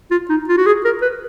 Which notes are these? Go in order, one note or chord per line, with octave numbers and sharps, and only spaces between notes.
F4
D#4
F4
F#4
G#4
A#4
B4